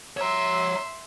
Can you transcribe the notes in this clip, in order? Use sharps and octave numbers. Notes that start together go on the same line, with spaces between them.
C#5 E5 A#5 C6